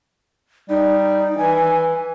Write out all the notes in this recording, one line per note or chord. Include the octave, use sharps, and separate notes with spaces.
G3 D#4
E3 G#5